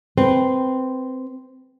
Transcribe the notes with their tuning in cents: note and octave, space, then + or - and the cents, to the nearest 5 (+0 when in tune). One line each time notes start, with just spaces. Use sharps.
C4 -10 B4 +0